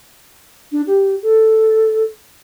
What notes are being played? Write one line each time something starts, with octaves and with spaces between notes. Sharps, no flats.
D4
G4
A4